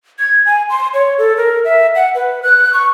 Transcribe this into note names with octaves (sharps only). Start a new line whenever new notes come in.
G#6
G#5
C6
C#5
A4
A#4
E5
F#5
B4
F#6
C#6